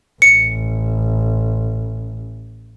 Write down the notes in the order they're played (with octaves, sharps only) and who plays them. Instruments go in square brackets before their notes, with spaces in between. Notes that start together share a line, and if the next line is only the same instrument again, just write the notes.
[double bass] A1 [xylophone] C#7